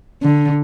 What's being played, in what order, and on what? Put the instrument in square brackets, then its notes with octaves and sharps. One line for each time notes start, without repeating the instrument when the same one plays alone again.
[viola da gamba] D3